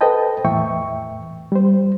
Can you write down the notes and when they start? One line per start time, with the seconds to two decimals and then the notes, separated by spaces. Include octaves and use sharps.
0.01 A4 B4 C5 D#5 G5 A5
0.45 E2 A2 E3 E5 G5 C#6
1.52 G3 C5